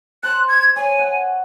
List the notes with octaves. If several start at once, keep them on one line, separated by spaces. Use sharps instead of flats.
C5 A5 F#6
G#6
C#5 G#5
F#5